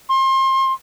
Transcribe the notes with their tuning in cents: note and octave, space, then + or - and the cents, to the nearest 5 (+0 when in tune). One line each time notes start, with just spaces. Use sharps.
C6 +30